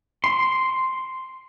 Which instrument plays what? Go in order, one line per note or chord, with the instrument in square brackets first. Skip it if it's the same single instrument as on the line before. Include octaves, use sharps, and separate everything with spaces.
[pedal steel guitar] C6